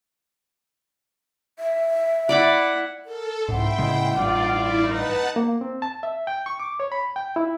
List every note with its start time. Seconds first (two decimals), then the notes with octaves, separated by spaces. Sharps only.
1.59 E5
2.29 E4 D5 F#5 B5 D6
3.05 A4 A#4
3.49 C2 G#2 E4 F#5 G5 C6
3.78 A2 C#3 G#3
4.17 A1 G2 D#4 F4 D5 F5
4.46 E4
4.88 D#4 B4 F#5 A5
5.36 A#3
5.61 C4
5.82 A5
6.03 E5
6.27 G5
6.46 C#6
6.60 D6
6.80 C#5
6.92 B5
7.16 G5
7.36 E4